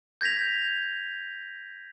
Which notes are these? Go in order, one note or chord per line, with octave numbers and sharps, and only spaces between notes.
G6 G#6 A#6 B6 F7